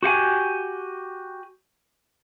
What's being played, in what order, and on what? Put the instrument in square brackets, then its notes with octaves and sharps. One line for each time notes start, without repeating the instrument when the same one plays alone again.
[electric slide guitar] F#4 G4 F#5 G#5